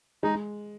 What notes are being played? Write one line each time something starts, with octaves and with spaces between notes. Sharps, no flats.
G#3 D#4